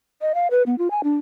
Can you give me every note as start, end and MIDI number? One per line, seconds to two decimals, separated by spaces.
0.21 0.32 75
0.35 0.48 77
0.51 0.63 71
0.66 0.75 59
0.78 0.90 65
0.91 1.01 80
1.04 1.15 62